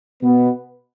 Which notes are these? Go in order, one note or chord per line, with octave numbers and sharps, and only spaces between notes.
B2 B3